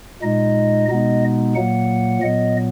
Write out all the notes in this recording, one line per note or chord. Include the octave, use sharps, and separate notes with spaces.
A#2 G#3 D#4 D#5
B2 G#3 B3 D#4 D#5
A#2 F#3 A#3 F#5
A#2 F#3 B3 D#5